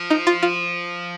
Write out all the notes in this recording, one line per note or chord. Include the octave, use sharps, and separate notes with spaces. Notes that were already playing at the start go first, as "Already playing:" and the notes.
Already playing: F3
D#4
F4
F4